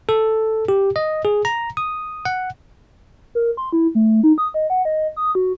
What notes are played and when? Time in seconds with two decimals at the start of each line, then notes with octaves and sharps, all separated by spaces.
0.09 A4
0.68 G4
0.96 D#5
1.25 G#4
1.45 A#5
1.77 D#6
2.25 F#5
3.35 A#4
3.57 C6
3.72 E4
3.95 A3
4.23 D#4
4.38 D#6
4.54 D#5
4.70 F#5
4.85 D#5
5.16 D#6
5.35 F#4